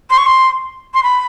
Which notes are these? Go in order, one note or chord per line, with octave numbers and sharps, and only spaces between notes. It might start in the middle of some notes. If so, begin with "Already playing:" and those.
C6
C#6
C6
C6
B5